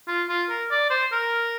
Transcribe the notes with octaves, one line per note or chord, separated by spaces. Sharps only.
F4
F4
A#4
D5
C5
A#4